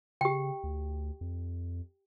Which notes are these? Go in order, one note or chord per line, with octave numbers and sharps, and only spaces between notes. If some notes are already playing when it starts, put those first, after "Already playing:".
C#3 G4 G5
D2
F2